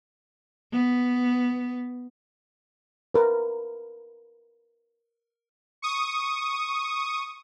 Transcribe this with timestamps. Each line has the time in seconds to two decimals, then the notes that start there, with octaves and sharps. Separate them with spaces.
0.73 B3
3.14 A#4 B4
5.82 C#6 D#6